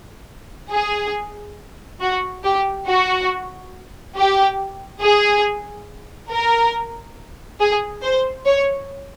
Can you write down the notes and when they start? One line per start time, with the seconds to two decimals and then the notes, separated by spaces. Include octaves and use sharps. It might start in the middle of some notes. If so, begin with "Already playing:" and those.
0.72 G#4
2.01 F#4
2.44 G4
2.87 F#4
4.16 G4
5.01 G#4
6.30 A#4
7.60 G#4
8.03 C5
8.46 C#5